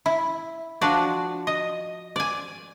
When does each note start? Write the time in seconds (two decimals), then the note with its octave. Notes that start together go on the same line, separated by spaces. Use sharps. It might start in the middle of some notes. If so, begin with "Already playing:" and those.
0.06 E4
0.81 F3 D4 F#4 D5
1.47 D#5
2.16 D5 G#5